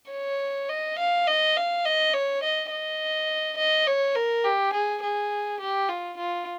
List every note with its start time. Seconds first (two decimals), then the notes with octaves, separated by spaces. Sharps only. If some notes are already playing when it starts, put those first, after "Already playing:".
0.11 C#5
0.69 D#5
0.99 F5
1.27 D#5
1.57 F5
1.85 D#5
2.14 C#5
2.43 D#5
2.71 D#5
3.57 D#5
3.87 C#5
4.15 A#4
4.44 G4
4.73 G#4
5.03 G#4
5.60 G4
5.89 F4
6.17 F4